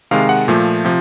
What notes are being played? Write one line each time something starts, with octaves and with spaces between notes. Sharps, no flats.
C3 D#3 G#3 F5
F#5
A#2 F3 A3
C3 F3